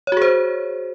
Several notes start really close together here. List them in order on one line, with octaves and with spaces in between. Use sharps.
C#5 F#4 G#4 C5